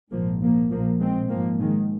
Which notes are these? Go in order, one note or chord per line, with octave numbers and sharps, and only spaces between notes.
A#1 G#2 F3 A#3
F3 A#3
A#1 A#2 F3 A#3
G#3 C4
G#1 G#2 F3 A#3
D#3 G#3